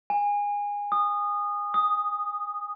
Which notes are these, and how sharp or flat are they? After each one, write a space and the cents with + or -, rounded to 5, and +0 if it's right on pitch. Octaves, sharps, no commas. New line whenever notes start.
G#5 -20
D#6 -20
D#6 +0